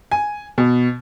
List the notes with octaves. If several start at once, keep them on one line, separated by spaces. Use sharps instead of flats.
G#5
B2